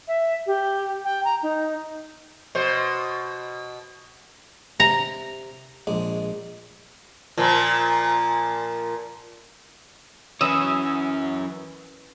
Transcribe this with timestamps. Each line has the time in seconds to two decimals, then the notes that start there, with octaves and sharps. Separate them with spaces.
0.08 E5
0.47 G4
1.04 G5
1.25 A#5
1.43 D#4
2.55 B2 C5
4.80 C3 A#5
5.87 A#1 G#3
7.38 A#2 F3
10.41 F#2 E3 C#4 C#5 D#6 E6